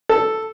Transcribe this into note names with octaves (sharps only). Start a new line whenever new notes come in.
A4